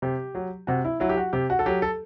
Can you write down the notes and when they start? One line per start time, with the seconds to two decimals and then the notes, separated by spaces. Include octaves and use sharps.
0.02 C3 G4
0.35 F#3
0.67 C3 F#4
0.85 E4
1.00 F#3 E4
1.09 G4
1.17 F#4
1.33 C3 G4
1.50 F#4
1.59 A4
1.66 F#3 G4
1.82 A4